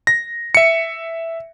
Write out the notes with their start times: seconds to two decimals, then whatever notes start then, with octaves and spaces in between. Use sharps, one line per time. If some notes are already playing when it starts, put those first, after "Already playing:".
0.07 A#6
0.55 E5 C#7